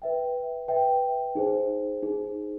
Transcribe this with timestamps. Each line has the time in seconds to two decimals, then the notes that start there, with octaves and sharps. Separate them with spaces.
0.02 B4 E5 G5
0.68 B4 E5 G5
1.35 D#4 G#4 C5
2.03 D#4 G#4 C5